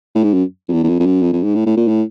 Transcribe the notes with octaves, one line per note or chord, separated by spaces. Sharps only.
A2
G#2
F#2
F2
E2
E2
F2
F2
F#2
F2
F2
G#2
A2
A2
A#2
A2